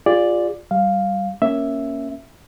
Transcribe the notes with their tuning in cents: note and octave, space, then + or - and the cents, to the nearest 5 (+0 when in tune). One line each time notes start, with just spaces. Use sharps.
F4 +10 G#4 -35 D5 +0
G3 -15 F5 +0
A#3 +10 C#4 +0 E5 +0